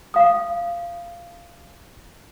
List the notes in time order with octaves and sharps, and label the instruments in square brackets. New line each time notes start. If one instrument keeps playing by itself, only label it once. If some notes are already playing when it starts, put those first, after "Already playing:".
[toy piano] F5 D#6